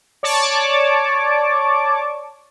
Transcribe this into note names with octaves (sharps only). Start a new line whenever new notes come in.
C#5 D5 A5 C#6 D6